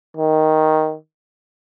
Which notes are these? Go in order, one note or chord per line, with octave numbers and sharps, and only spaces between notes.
D#3